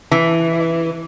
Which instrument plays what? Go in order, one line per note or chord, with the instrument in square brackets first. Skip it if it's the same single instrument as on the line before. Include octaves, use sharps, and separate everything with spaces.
[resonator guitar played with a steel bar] E3